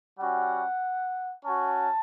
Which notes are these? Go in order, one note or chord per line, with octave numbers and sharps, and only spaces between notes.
G3 C#4 F#4 F#5
C#4 F#4 A5